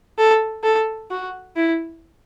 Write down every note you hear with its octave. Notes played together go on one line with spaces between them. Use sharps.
A4
A4
F#4
E4